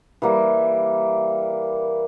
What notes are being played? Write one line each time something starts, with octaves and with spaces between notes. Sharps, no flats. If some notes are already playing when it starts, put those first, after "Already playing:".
E3 G3 A#3